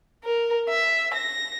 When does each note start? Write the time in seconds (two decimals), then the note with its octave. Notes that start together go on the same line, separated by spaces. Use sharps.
0.24 A#4
0.69 E5
1.14 A#6